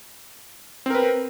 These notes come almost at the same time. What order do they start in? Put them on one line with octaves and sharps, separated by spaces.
C4 A#4 B4